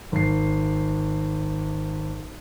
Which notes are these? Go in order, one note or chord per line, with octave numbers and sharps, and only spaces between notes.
G#1 C7